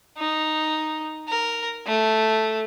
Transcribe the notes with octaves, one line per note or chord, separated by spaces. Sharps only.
D#4
A#4
A3